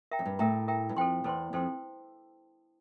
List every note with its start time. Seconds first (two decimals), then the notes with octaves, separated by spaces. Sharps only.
0.11 A#4 E5 G5 A#5
0.19 F2
0.25 G2
0.39 A2 A#4 E5 G5 A#5
0.68 A#4 E5 G5 A#5
0.89 G2
0.96 F2 A4 C5 G5 C6
1.24 E2 A4 C5 G5 C6
1.53 F2 A4 C5 G5 C6